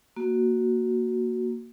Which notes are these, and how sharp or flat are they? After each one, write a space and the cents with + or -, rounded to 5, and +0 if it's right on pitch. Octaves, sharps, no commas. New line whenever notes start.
A#3 +0 F#4 +0